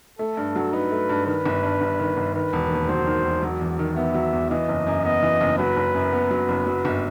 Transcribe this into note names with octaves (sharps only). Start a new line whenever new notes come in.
A3 A4
G2
F#3
D#4 B4
A3
G2
D#3 B4
G1
G2
G1
D#3
G1
D#3 B4
E1
D#2
F#3 C5
D#3
E1
F#3
E2
D#3
B3 E5
F#3
E2
E3 D#5
F#1
F#2
B3 D#5
E3
F#1
F#3 B4
F#1
F#2
B3
F#3
F#1
F#3
G1